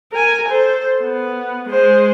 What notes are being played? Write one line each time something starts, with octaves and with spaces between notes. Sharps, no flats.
A#4 G#5
A4 C5
B3
G#3 C5